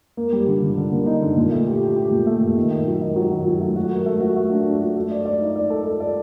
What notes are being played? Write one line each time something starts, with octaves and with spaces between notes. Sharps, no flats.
A#3
G3
D3
D3
D3
A#3
D#4
D3
A#2
A3
G4
G4
G4
A#2
A3
A#2
D#3
D#3
F#3
D#3
F#3
D#3
F#3
A3
F#4
A#4
A3
F#4
A3
D4
D4
F#4
A3
D5
D5
D#4
D5
A4
A4
D5